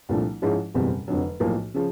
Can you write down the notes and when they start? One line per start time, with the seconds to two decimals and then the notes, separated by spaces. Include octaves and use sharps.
0.09 C2 A#2 F3 A3 D4
0.42 G#2 F3 G#3 C#4 E4
0.74 F#1 E2 B2 G3 C4
1.08 F1 F2 D3 F#3
1.40 B1 A2 F3 A#3
1.74 C#3 F3